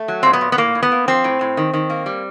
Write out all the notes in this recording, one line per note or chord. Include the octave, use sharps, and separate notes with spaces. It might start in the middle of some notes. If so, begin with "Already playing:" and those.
Already playing: A3
F#3
A#2 C4
B3
A#2
B3
A2 A#3
A2
B3
A#3
F3 C4
A2
A2
D#3
D#3
A#3
G3